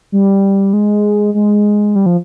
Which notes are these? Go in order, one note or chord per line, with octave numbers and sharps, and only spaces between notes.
G3
G#3
G#3
G3
F3